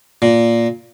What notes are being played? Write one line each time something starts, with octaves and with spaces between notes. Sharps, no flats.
A#2